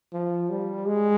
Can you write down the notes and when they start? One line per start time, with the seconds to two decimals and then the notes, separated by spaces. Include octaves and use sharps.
0.13 F3
0.50 G3
0.87 G#3